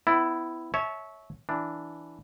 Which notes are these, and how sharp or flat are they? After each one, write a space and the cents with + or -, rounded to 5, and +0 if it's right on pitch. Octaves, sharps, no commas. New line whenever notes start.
B3 +35 E4 +0
C#5 +0 E5 -20 A5 -35
E3 +0 D4 +0